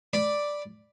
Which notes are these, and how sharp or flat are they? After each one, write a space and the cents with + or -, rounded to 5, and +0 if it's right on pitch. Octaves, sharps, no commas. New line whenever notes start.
D5 +0 B5 +0